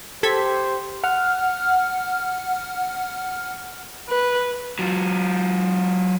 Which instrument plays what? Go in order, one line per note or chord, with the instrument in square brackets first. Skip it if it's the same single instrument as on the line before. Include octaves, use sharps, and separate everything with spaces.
[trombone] G4 [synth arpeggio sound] A4 G#6 B6 [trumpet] C5
[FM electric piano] F#5 F6
[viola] B4
[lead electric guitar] F#3 F4